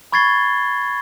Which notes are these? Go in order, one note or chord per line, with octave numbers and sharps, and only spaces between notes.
B5 C#6 G#6 A6 C7 G7